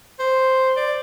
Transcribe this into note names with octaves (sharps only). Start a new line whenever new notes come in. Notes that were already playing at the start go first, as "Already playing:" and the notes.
C5
D5